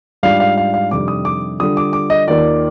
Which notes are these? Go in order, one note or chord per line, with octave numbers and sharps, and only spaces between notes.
G#2 G3 D4 F4 F5
F5
F5
F5
F2 C3 D#3 G3 D4 D6
D#6
D6
D3 G3 D4 F4 D#6
D6
D6
D#5
D#2 D#3 A#3 F4 D5